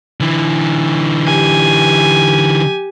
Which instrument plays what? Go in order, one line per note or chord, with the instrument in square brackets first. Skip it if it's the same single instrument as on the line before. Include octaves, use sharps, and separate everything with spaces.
[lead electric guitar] D3 E3
[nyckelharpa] G4 G#5